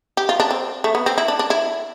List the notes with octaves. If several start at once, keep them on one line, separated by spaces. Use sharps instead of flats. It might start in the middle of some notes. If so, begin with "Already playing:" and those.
G4
F4
D4
C4
A3
B3
C4
E4
D4
D4
E4